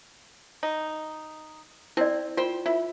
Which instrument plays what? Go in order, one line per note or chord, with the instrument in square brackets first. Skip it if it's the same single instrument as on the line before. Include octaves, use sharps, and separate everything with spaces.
[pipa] D#4
[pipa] C4 [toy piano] E4 D5
[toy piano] F4 [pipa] C5 G5
[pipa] E4 [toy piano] F4